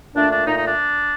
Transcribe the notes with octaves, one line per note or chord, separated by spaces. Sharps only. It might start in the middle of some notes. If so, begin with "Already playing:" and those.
A#2 A3 D4
D4
A#2 A3 D#4
D#4
D4